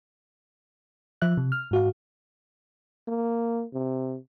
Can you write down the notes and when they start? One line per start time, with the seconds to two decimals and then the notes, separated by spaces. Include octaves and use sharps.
1.22 F3 E5 F#6
1.37 C3
1.52 F6
1.71 G#2 F#4 F5
3.08 A#3
3.73 C3